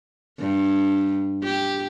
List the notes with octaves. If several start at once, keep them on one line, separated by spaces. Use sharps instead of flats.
G2
G4